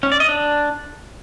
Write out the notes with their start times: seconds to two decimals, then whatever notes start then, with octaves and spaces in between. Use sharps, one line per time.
0.03 C#4
0.12 D5
0.20 D#5
0.29 D4